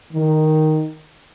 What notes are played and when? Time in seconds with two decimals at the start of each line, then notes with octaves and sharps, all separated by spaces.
0.13 D#3